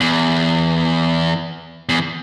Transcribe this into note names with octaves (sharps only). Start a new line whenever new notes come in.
E2
E2